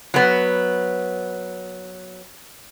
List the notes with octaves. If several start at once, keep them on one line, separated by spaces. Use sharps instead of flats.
F#3 B3